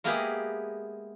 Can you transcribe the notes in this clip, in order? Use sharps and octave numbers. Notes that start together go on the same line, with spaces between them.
G#3 A#3 B3 E4 G4 G#4